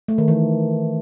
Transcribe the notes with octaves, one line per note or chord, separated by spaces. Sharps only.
A3
D#3
E3